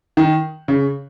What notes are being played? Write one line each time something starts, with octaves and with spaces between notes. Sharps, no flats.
D#3
C#3